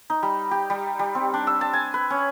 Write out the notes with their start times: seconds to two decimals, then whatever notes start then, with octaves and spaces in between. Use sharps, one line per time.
0.10 D#4
0.23 G3
0.51 G4
0.70 G3
0.99 G3
1.15 C4
1.34 D4
1.47 E6
1.61 A5
1.73 G#5
1.94 B4
2.10 C#4